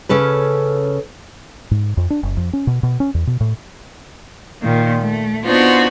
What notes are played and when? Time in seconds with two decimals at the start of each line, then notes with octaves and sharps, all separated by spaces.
0.09 C#3 C#4 A4 B4
1.71 G#2
1.97 F2
2.10 D4
2.23 F#1
2.37 F2
2.53 C#4
2.67 B2
2.83 B2
3.00 C#4
3.14 E2
3.27 B2
3.40 A2
4.60 A#2 D#3 A#3
4.99 A3
5.43 B3 C4 D4 D#4 F4 F#4